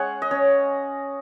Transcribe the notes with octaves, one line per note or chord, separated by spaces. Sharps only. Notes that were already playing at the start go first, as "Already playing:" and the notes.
Already playing: G#3 C#4 C#5 F#5 G#5
D#5
C#4 C#5